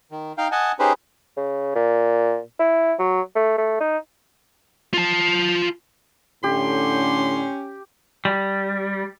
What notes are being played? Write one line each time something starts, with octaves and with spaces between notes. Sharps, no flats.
D#3
D#4 F5 G5
D#5 F#5 G#5 A5
C#4 D#4 G4 G#4 B4 C5
C#3
A#2
E4
F#3
A3
A3
D#4
F4 A5
A2 D3 C#4 G4 C6
G3